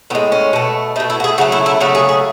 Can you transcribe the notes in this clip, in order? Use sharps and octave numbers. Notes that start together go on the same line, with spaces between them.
A2 G#3 B3
C#4
B2 A3
B2 A3 D#4
E4
F#4
G#4
C#3 F#3 A3 F#4
E4
E4
C#3 F#3 A3 F#4
G#4
G#4